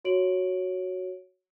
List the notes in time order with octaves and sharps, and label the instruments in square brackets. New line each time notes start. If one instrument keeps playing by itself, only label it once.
[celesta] F#4 C#5 D7 F#7